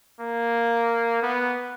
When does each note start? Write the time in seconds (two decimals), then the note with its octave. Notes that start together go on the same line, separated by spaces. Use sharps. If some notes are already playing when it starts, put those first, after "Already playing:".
0.20 A#3
1.23 B3